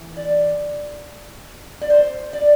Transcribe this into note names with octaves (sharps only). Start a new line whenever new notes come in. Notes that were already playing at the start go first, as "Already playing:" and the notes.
Already playing: E3
D5
D5
C5
D5